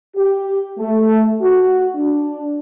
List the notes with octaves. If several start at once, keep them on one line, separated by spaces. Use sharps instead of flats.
G4
A3
F#4
D4